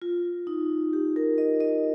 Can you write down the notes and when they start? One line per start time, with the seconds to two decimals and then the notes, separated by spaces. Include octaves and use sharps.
0.02 F4
0.47 D#4
0.93 G4
1.16 A#4
1.38 D#5
1.61 D#5